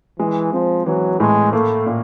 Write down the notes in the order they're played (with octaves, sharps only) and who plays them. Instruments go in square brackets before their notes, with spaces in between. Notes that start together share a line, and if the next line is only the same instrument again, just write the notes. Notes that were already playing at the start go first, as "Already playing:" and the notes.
[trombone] E3 [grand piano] G#3
[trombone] F3 [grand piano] C4
[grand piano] E3 [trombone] F#3
[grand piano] A2 [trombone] G#3
[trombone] A3 [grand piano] A#3
[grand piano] A#2